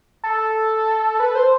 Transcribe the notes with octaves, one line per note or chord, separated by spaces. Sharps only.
A4
B4
C5